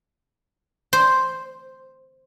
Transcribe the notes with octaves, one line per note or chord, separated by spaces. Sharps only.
C5